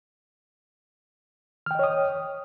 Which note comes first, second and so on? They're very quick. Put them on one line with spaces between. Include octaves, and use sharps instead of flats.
F6 G5 D#5 C#5 D#6